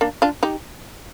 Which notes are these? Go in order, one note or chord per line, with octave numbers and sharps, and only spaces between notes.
A#3 D4
D4 F4
D#4 G4